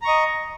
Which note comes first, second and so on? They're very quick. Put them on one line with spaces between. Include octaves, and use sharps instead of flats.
A#5 C#6 D#5